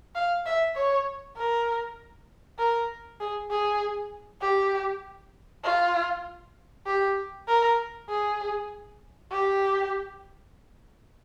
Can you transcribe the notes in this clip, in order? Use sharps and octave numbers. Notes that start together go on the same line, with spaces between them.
F5
E5
C#5
A#4
A#4
G#4
G#4
G4
F4
G4
A#4
G#4
G4